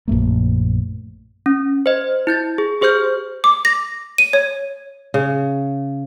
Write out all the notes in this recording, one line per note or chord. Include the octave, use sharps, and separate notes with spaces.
A#1 F#2 A3 A#3
C#4
C5 D#5
E4 G6 A6
G#4
G4 G#4 C5 F6 G6
D6
A#6
D#7
C#5
C#3